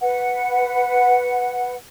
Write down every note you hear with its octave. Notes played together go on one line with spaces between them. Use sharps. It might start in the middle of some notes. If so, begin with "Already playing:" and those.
B4 F#5